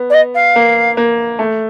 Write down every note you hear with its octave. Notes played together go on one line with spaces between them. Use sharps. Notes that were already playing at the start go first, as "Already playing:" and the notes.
Already playing: B3
D5
D#5
F5
A#3
A#3
A3